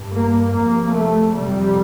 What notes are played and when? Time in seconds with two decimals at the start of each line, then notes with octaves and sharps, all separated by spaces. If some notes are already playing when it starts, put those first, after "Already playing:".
Already playing: G2
0.12 A#3
0.53 F2 C3 A#3
0.95 A3
1.36 F2 C3 G3